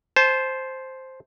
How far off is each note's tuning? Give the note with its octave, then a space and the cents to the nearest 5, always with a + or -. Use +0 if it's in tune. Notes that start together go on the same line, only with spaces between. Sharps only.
C5 +0 A5 -35